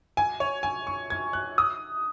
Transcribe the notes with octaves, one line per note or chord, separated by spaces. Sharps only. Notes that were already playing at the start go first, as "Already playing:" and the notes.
G#5
C#5
G#5
C#6
G#6
F#6
D#6